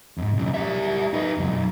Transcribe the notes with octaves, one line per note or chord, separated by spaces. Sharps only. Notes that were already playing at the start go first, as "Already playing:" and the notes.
F2 G#2
B1 C#3
G3 E5
D#4 B4
C#2 F#2
B1